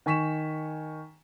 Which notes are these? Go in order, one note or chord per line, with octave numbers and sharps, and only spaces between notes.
D#3 G#5 C#6 B6 E7